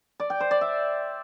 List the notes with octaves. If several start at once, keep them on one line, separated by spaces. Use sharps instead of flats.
D5
G5
C5
D5
E5